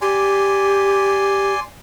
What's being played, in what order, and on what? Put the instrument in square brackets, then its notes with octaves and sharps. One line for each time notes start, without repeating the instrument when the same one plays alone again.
[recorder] G4 [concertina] D5 G#5 C6